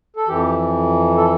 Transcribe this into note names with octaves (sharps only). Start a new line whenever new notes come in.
A4
F2 E3 G4
A4